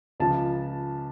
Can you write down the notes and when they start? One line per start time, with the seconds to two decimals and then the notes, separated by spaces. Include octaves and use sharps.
0.20 C#2 C#3 F3 A5